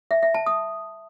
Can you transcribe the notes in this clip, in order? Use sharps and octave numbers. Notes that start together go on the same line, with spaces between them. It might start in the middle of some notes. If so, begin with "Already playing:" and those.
E5
E5
A5
D#6